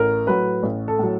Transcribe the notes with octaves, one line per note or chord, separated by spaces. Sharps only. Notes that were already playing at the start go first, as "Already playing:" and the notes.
Already playing: A1 A#4
A2 F#3 B4
A1
A4
A2 F#3